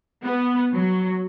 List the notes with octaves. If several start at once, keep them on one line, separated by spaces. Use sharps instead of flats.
B3
F#3